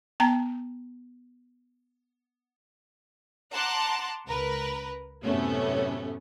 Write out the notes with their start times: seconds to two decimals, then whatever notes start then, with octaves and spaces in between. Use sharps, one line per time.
0.20 B3 G5 A5 A#5
3.52 F#5 A5 A#5 C6 D6 F#6
4.26 C#2 A#4 B4
5.24 F#2 A2 C3 A3 B3 C#4